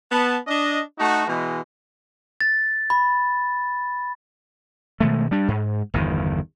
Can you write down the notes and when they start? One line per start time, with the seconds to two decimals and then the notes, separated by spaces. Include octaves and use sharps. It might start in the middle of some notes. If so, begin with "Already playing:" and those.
0.11 B3 A5
0.47 D4 D#5
0.98 A3 D#4 F#4
1.28 B2 E3 G#3
2.41 A6
2.90 B5
5.00 B2 D#3 G#3 A3
5.31 G3 D4
5.48 G#2
5.94 G1 E2 D#3